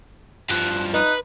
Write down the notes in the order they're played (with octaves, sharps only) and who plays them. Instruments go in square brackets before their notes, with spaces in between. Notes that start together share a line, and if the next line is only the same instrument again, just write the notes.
[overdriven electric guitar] G2 F3 [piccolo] F#6
[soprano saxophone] D#4 [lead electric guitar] B4 [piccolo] F#6